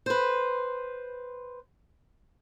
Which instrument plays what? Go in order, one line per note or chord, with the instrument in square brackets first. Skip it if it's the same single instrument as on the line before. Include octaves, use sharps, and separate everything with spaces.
[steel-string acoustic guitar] B4 C5